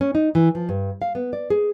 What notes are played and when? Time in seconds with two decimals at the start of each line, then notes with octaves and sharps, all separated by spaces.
0.01 C#4
0.15 D#4
0.35 E3
0.55 F3
0.69 G2
1.02 F5
1.15 B3
1.33 D5
1.50 G#4